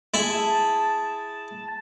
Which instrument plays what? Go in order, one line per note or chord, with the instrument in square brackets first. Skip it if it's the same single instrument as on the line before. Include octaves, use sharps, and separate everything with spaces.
[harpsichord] E4 G#4 [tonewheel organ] A5